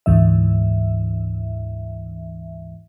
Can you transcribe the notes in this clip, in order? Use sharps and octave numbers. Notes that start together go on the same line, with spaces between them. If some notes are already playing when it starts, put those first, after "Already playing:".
D2 G#2 E3 E5